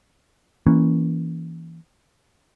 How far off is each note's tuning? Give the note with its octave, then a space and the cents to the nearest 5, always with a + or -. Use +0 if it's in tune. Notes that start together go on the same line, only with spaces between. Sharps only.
E3 +0 A#3 +0 C#4 +0